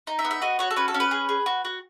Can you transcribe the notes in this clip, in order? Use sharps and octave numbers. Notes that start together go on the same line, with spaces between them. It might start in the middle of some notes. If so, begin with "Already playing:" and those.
D#4
E5
B3
E5
F#4 D#5
F#4 C#5
A4
C#4 B4
A4
C#4
B4
G#4
G#4
F#4
F#4